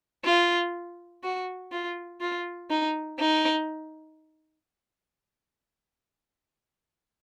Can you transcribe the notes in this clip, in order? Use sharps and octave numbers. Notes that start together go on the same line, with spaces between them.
F4
F#4
F4
F4
D#4
D#4